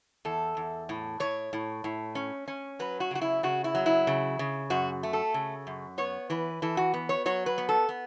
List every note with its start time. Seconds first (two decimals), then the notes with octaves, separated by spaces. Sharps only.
0.25 E2 A4
0.57 E2
0.89 A2
1.20 A2 C#5
1.53 A2
1.84 A2
2.15 C#4
2.48 C#4
2.79 F#3 B4
3.00 F#4
3.11 C#3 F#4
3.21 E4
3.43 C#3 F#4
3.64 E4
3.75 F#3
3.86 E4
4.07 C#3
4.39 C#3
4.70 F#2 F#4
5.03 A3
5.13 A4
5.34 C#3
5.67 F#2
5.98 B3 C#5
6.30 E3 B4
6.62 E3 A4
6.77 F#4
6.94 B3
7.09 C#5
7.26 F#3 C#5
7.46 B4
7.58 B3
7.69 A4
7.89 B3